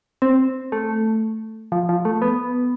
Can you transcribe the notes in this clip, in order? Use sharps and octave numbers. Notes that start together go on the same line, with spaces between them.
C4
A3
F3
F3
A3
B3